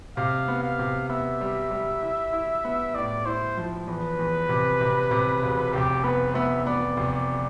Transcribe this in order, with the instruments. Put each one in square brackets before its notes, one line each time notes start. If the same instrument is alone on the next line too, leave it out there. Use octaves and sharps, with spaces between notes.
[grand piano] C3 [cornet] F5
[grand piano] B3
[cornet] F5
[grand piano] C3
[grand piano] B3 [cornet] E5
[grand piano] G3
G3
E4
E4
B3
[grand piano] A2 [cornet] D5
[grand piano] E4 [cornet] C5
[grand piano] F3
[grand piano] E2 [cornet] B4
[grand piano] E2
C3
C3
C3
E1
[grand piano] F1 [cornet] G4
[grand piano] B3 [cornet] B4
[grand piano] B3 [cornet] E5
[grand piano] B3 [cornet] D5
[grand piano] F1
[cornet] D5